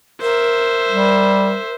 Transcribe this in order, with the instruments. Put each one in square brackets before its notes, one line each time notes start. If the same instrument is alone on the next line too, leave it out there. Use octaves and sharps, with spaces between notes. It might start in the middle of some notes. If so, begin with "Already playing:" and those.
[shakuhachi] A#4 [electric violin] C5 E5
[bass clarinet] G3